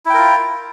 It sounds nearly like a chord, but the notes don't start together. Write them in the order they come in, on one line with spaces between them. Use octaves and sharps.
E4 G5 A#4 F4